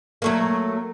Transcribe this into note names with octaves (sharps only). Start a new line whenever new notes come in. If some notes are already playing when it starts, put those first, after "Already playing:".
F#3 A3 A#3